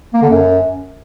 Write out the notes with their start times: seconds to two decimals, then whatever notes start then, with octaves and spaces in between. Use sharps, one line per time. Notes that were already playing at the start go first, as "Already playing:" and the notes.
0.13 A#3
0.22 D3
0.30 F#2